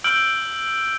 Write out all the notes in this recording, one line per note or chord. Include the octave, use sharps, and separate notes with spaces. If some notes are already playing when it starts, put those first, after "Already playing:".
E6 F6 G6 D7 F#7 G7